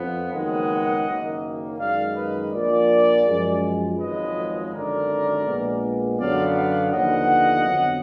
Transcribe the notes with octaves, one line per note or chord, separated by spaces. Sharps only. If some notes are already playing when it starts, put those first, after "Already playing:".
Already playing: F2 F3 B3
F#1 F#2 D#3 G#3 B3 D#5 F#5
F#1 F#2 D#3 A#3
F#2 D#3 G#3 D5 F5
B4 D#5
A#1 A#2 F3 A#4 D5
F#2 F3 G#3
G#1 F#2 F3 G#3 B4 D#5
G#1 F#2 D3 A#4 D5
A#1 A#2 G#3 B3
F#2 D3 F#3 B3 D5 F5
D5 F5
D#2 D3 F3 B3 D#5 F#5
F2 D3 F#3 B3